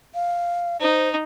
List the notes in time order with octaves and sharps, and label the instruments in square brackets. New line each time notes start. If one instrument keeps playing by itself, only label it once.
[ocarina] F5
[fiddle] D#4 [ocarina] C5